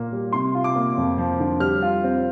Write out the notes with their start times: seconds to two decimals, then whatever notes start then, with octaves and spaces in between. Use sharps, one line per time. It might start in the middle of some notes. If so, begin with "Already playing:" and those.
Already playing: A#2 A#3
0.12 G3
0.33 C3 C6
0.55 F4
0.64 D6
0.76 A#3
0.97 F2
1.18 F3
1.39 D3
1.60 G3 F6
1.82 F4
2.04 C4